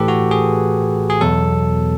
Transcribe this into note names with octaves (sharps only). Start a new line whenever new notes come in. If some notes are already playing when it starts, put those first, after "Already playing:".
Already playing: A2 E3 G4 A4 B4
F#4
G#4
G#4
E2 B2 F#3 A4